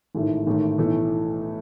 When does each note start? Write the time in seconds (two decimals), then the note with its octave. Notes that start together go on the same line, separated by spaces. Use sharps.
0.15 A1 G#2 D#3 A3 E4
0.47 A1 G#2 D#3 A3
0.78 B1 A2 E3 A3